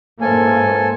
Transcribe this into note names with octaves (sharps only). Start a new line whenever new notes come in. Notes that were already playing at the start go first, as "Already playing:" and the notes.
A1 G#2 A#3 A4 C5 G#5